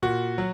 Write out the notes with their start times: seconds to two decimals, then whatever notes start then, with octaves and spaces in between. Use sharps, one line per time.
0.02 A#2 F#4
0.38 F#3